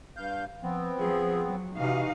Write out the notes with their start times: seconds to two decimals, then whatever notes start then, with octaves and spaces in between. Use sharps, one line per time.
0.17 G2 F5 G6
0.63 F3 B3 C4
1.00 F3 G#4
1.45 F#3
1.77 C3 E3 D#4 F#4 F5